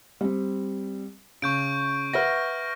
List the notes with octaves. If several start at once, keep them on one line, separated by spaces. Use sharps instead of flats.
G3 C4
C#3 C#6 G6 D7
B4 E5 F#5 F6 A#6